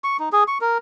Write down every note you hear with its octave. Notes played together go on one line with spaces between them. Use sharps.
C#6
D#4
G#4
C#6
A#4